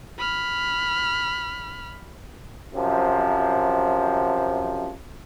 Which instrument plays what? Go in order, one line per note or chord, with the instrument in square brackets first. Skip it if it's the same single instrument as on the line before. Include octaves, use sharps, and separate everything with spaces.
[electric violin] B5 F6
[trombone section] F#2 C3 F3